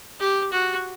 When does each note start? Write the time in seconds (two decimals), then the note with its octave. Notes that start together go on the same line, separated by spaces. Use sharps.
0.20 G4
0.51 F#4